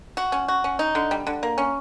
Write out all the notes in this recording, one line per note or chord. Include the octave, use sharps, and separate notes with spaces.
F#4
C#4
F#4
C#4
D#4
D3
G3
D3
A#3
C#4